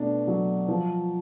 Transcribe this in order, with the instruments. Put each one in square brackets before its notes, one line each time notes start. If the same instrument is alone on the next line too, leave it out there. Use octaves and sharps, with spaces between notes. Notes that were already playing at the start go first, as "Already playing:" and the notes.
Already playing: [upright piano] B2 A3 D4
F#3
F3